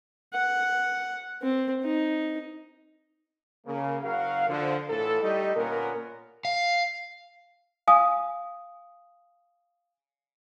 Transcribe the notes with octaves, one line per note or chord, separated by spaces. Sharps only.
F#5
C4
D#4
C#3 A#3
F#1 F#3 F#4 A#4 F5
D3 F3
A2 E3 B3 F4 A4
G3 A3 D#4 G4 D#5
A#2 D3 B3 C#4 A#4
F5
F5 G#5 D#6